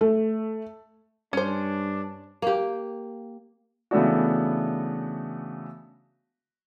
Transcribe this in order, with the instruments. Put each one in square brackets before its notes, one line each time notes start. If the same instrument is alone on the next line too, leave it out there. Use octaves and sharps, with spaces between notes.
[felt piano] A3
[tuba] G2 [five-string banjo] C#4 C5 [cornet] D4
[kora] A#3 G4
[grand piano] C#3 E3 A3 B3 D4 F#4